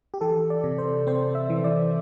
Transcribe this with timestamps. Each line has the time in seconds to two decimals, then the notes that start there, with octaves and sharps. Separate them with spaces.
0.14 G4
0.21 E3 A4
0.50 D5
0.64 C3
0.78 C5
1.07 C4 C5
1.35 E5
1.50 E3
1.64 D5